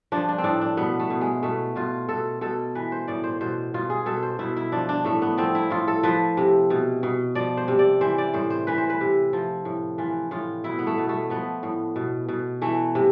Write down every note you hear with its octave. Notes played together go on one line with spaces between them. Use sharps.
F3 D4
D4
C4
A2 D4
D4
B2 B3
A3
B2
G#3
B2 A3
B2 F4
B2 A4
B2 A4
E3 B4
C5
A2 D5
C5
B2 C5
B2 F4
G#4
B2 A4
C5
B2 E4
E4
F3 D4
D4
A2 A3
B3
F3 C4
E4
A2 F4
A4
F3 B4
C3
B2
B2
F3 D5
C5
C3
D5
E3 C5
D5
A2 C5
C5
E3 B4
C5
B4
C3
F3
A2
E3 F4
A2 F4
B2 E4
B3
A3
B2
A3
F3 B3
A2
B2
B2
E3 A3
C3